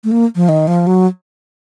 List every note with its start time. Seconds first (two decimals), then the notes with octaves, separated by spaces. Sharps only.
0.04 A3
0.11 A#3
0.36 F3
0.49 D#3
0.68 F3
0.87 F#3